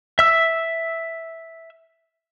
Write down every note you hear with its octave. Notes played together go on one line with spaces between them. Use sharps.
E5 E6